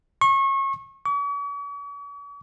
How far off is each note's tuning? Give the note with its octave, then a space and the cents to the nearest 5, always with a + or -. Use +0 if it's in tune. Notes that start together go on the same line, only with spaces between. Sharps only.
C#6 -30
C#6 +45